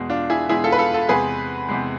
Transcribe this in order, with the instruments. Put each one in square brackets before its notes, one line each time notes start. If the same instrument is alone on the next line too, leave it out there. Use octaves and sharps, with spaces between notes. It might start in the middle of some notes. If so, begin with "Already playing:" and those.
Already playing: [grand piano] E2 B2 G#3
D4 F4
E4 G#4
E2 B2 G#3 E4 G#4
F4 A4
B4
F4 A4
F4 A4
E2 C3 G#3 G#4 B4
E2 C3 G#3